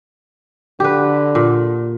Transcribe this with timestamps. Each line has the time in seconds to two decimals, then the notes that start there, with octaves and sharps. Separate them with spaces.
0.80 D3 G4 B4
1.35 A#2